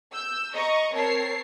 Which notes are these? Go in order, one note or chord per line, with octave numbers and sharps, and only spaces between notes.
E6 G6
D#5 A#5 C#6
C4 A#4 C#5 A5 C7